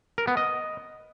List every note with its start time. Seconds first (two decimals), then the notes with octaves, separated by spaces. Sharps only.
0.18 A#4
0.27 B3
0.37 D#5